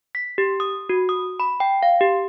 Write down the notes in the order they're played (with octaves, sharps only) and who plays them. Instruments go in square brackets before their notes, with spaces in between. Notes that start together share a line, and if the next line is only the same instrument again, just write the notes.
[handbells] B6
G4
D#6
F#4
D#6
B5
G5
F5
G4